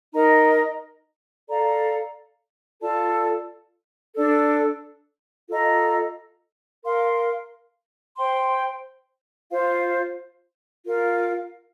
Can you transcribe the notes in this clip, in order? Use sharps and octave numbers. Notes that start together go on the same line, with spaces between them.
D#4 A#4 D#5 A#5
A4 D5 F5 A#5
F4 A4 D5 A5
D4 A4 D5
F4 A4 D#5 A#5
A#4 F5 C6
C5 G5 C6
F4 C5 F5
F4 A#4 F5